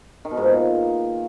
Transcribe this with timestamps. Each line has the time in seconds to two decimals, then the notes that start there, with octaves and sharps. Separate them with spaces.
0.25 D#3
0.31 B2
0.37 G#2
0.44 A#2